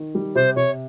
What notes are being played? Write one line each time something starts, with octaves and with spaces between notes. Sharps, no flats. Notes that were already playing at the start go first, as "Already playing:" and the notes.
Already playing: D#3
G3
C3 C5
C3 C#5